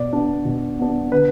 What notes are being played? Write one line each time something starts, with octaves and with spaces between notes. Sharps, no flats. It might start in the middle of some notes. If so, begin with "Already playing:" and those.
Already playing: B2 D5
B3 D4
B2
B3 D4
D3 B4